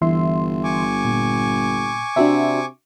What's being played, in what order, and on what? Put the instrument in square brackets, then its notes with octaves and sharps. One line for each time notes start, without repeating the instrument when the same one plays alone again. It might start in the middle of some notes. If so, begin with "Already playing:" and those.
[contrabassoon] G1 [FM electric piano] E3 E5 C6
[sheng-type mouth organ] G#5 C#6 D6
[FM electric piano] A#2
[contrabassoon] C3 [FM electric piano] D4 F#4 E5